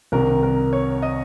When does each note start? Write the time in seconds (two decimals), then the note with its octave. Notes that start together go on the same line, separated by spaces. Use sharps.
0.12 C2 C3 D#3 A#4
0.43 A#4
0.73 C#5
1.02 D#5